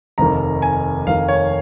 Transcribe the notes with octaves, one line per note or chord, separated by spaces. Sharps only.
F1 D#2 D#3 A#5
G#5
F1 D#2 D#3 F5
C#5